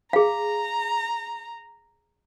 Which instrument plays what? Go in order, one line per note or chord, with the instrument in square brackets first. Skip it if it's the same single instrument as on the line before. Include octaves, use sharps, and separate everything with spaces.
[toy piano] G#4 F5 [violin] A#5